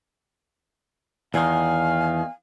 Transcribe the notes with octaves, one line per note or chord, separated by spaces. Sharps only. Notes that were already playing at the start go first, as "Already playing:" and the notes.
E2 D#3 F5 G#5